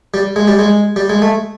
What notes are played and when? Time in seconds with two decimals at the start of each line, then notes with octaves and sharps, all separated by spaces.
0.14 G3
0.36 G#3
0.48 G3
0.59 G#3
0.96 G3
1.10 G#3
1.22 A3